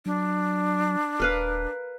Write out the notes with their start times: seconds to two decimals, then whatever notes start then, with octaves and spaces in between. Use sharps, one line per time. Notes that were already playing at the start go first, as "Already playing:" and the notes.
0.06 F#3 D4
1.20 D#1 A#4 B4 F5